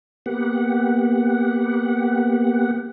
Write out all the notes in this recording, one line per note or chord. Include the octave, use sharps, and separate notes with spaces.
A#3 B3 G4 F#5